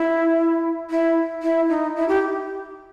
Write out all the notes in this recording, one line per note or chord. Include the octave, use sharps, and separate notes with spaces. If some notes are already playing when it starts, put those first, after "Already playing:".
Already playing: E4
E4
E4
D#4
E4
G4